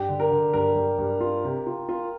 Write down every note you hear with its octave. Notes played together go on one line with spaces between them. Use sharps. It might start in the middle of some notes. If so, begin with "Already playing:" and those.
Already playing: G2 G4
D3
A#4
D3
G2 A#4
G2
G2
F4
C3
F4
F4